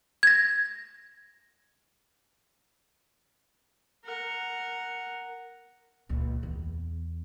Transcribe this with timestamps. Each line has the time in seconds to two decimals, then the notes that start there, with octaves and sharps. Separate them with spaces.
0.23 G#6 A#6
4.05 A#4 F#5
6.09 C#2 A#2
6.43 E2